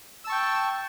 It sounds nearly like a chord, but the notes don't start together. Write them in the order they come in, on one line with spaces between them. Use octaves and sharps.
E6 A5 C#6 G5